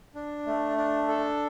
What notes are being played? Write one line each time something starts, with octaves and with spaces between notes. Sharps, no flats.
D4
A3
D4
A4